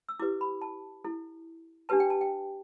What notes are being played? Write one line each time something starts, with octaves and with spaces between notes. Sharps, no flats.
E6
E4 G4 B4 D6
B5
A5
E4 A4
D4 G4 B4 A5
G5
A5
G5